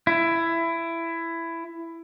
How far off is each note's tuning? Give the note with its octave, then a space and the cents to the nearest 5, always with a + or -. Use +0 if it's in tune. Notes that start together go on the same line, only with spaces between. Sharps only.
E4 +15